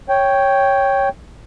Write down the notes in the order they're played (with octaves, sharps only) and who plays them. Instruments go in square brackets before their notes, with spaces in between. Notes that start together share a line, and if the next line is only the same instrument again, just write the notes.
[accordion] C#5 G5